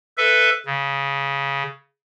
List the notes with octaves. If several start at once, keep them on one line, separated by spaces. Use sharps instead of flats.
A4 B4 E5
C#3